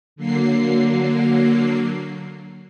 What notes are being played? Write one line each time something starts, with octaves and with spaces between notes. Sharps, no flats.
D3 F#3 A#3 C7